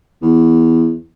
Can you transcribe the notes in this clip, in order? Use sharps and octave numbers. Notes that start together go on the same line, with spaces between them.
E2